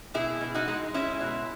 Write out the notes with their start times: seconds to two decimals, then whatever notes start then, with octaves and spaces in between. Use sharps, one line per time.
0.14 B2 E4 G#4
0.41 B2
0.54 D#4 F#4
0.68 G#3
0.94 G#3 C#4 E4
1.21 B2